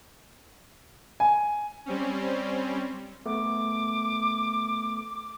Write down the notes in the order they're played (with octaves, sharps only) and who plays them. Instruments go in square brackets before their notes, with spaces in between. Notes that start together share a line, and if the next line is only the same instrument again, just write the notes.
[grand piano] G#5
[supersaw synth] G3 C4 C#4
[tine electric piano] A3 B3 [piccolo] D6